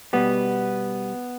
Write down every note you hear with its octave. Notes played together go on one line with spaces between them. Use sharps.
B2 G3 B3